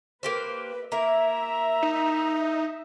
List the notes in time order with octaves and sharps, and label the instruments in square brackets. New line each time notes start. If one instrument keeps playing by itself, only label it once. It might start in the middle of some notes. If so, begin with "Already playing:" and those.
[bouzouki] A#3 G4 C5 [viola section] B4
[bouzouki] A#3 E4 [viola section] E5 [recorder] A#5
[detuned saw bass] D#4